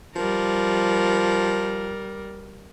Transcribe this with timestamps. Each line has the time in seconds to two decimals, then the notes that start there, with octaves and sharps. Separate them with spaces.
0.16 F3 G3 A#4